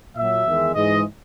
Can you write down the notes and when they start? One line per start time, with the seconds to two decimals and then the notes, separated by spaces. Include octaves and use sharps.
0.16 A#2 F#3 E5
0.45 E2 D#3 G#3
0.75 G#2 E3 G#3 D#5